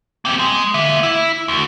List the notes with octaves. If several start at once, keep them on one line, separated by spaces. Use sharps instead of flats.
A#3 C4
G#3
A#3 E5
E4
D2